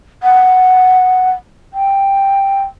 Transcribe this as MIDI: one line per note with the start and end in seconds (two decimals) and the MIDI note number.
0.23 1.31 78
1.74 2.62 79